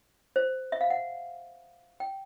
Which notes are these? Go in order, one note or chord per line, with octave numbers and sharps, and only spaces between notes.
C5
E5
F5
F#5
G5